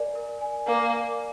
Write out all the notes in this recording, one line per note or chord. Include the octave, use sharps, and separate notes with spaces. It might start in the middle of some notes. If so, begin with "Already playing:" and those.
Already playing: A#4 D5 G#5
A#4
G#5
A#3 D5
F5
A#4